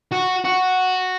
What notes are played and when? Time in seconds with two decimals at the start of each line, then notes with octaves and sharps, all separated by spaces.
0.12 F#4
0.45 F#4